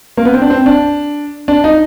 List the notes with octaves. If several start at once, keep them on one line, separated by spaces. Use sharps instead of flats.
A#3
B3
C4
D4
C4
D4
D4
D#4